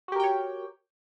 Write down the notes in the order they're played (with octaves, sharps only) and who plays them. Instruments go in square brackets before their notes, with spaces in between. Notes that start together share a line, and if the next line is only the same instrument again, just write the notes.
[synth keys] F#4
G4
A#4
G5
C#5